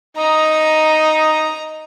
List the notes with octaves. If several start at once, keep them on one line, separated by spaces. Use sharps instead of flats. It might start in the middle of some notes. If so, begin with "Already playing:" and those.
D#4 A#5